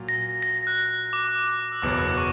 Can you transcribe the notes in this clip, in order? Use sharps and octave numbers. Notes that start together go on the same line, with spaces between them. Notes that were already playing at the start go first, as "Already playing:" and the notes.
Already playing: A#2 F#3
A#6
A#6
F#6
D6
D6
E6
F#1 E2 B2 F#3 B3 D6
C#6